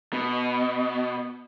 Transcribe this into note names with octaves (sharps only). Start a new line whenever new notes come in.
B2